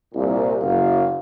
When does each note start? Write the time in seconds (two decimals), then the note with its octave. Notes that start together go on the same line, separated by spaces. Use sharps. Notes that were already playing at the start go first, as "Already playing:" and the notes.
0.14 C2 A#2
0.61 F#1 F#2 F5